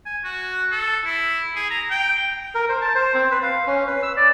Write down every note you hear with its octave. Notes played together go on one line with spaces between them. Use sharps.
G#5
F#4
A4
E4
G#4
A#5
G5
A#4
C5
A5
C5
C4
B4
F5
C#4
B4
E6
D5